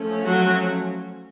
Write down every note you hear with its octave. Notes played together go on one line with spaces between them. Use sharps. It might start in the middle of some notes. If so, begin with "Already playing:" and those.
Already playing: F3 A3 C#4
F#3 F#4